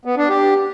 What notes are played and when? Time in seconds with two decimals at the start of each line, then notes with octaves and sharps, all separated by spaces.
0.05 B3
0.17 D4
0.29 G4